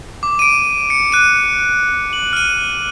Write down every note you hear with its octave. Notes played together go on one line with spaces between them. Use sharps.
D6
D7 D#7
C#7
F#6 D#7
F#7
F6 D#7